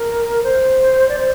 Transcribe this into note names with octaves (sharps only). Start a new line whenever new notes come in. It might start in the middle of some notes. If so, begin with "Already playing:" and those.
Already playing: A#4
C5
D5
C5